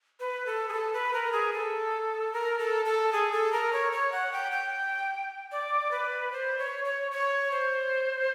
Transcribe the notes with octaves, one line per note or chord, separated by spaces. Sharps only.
B4
A4
G#4
A4
B4
A#4
G#4
A4
A#4
A4
A4
G#4
A4
A#4
C#5
C#5
F#5
G5
G5
D5
B4
C5
C#5
C#5
C#5
C5